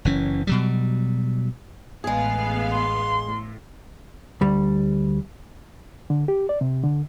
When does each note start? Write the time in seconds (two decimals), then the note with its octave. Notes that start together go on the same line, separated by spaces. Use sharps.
0.05 F#1 E3 C#4
0.47 B2 F#3 G3
2.04 A1 G#3 B3 G#4 F5
2.70 C6
3.27 A2
4.41 D2 G3
6.10 D3
6.28 G4
6.49 D5
6.61 C3
6.83 D3